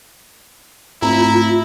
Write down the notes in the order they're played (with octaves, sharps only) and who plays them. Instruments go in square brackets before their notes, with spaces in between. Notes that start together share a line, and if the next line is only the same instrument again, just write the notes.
[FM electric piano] G#2 A3 C4 [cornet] E4 [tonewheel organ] F4 [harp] A#5